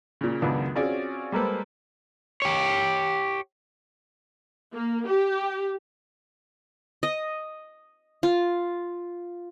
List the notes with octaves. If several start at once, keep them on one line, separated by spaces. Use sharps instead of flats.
A#2 C#3
C#2 F#2 D#3 B3 D4 F4
C4 C#4 F4 F#4 G#4 D5
G3 G#3 A#3 A4 B4 C5
G4 C#5
A#3
G4
D#5
F4